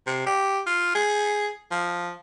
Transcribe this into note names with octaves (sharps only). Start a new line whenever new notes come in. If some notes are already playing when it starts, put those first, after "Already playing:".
C3
G4
F4
G#4
F3